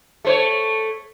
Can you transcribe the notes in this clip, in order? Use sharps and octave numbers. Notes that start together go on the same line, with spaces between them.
A3 C5 C#5